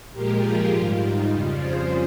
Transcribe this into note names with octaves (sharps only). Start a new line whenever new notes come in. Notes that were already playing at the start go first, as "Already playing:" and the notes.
A#2 F3 G#3 G4 A#4
F4 G#4
G#2 D#3 G3 F4
D#4
F2 C#3 G3 F4
G#4 C5